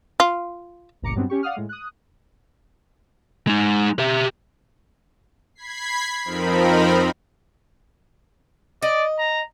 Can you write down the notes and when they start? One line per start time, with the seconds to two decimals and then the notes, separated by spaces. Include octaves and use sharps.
0.20 F4
1.02 G1 C#2 A#2 A#5 D6 C#7
1.15 G2 F#3 G3 B3 C4 D4
1.30 C#4 G4 C#6
1.43 D5 F5 F#5 D#6 F6
1.56 A2 G#3
1.69 D#6 F#6
3.47 G#3 D#4
3.99 G4 E5
5.55 B5 G#6 B6 C7
6.24 F2 F3 C4 D#4 A#4 B5
8.82 D5 D#5
9.19 A#5